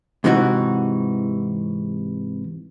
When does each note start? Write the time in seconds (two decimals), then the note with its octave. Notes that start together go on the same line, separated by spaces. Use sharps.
0.24 G#2 C3 E3 D#4 F#4